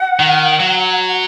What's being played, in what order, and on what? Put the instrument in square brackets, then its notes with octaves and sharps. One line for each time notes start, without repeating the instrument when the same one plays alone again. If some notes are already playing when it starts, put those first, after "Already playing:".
Already playing: [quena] F#5
[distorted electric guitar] D#3
F#3